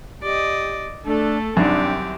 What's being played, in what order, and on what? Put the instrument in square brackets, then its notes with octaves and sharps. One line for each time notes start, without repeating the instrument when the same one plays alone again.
[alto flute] G4 [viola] D5 D#5
[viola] A3 A4 [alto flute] D4
[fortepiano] C2 F#2 D#3 [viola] C4 G4 [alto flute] D4